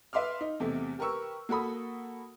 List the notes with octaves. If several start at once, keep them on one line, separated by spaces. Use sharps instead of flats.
B4 E5 F5 C6 D6 F6
D#4
E2 C3 A3
G4 A#4 B4 C#6 E6
A#3 F#4 A4 B5 D#6